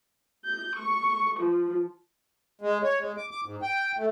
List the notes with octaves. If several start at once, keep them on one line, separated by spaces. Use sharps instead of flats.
G6
C#6
F3
G#3
C#5
G#3
D6
D6
G#2
G5
A3